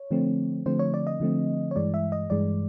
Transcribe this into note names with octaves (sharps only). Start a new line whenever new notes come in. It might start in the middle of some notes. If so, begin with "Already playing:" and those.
Already playing: C#5
D3 F3 A3 C4
D3 F3 A3 C4 C5
C#5
D5
D#5
D3 F3 A3 C4
C#5
G2 E3 G#3 D5
E5
D#5
G2 E3 G#3 D5